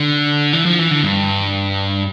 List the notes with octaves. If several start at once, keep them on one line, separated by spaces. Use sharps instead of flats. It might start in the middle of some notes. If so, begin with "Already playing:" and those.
Already playing: D3
E3
F3
E3
D3
G2